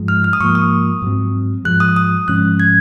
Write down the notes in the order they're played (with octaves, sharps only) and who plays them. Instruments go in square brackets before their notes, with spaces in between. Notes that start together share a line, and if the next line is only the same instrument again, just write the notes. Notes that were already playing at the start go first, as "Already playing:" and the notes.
Already playing: [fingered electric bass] G#2 F3 G#3
[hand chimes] F6
F6
D#6
[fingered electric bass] G#2 F3 A#3 [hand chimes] C#6
[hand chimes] D#6
[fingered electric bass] G#2 F#3 C4
[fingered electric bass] G#2 F3 G#3 [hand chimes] F#6
[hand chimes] D#6
D#6
[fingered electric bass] G#2 F3 G#3 C#4 [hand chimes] F#6
[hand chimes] G#6